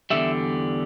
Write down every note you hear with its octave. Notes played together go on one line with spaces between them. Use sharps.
E2 D3 G3 E5